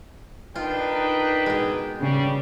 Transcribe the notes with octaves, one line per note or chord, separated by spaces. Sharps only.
D4 D#4 F4 A#4 B4 G5
B2 G#3
C#3 G3